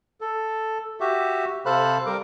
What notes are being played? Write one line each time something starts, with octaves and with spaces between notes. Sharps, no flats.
A4
F#4 G4 E5
C3 A4 C5 F5 B5 F#6
G3 A#4 D6